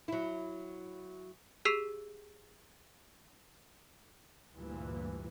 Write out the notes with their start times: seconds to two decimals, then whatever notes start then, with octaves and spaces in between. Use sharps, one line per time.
0.08 F#3 E4
1.65 G4 G#4 E6 B6 C7 F7
4.56 D2 G2 A#2 E3